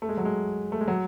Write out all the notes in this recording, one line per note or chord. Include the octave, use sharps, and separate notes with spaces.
A3
G#3
F#3
G#3
A3
G#3
F#3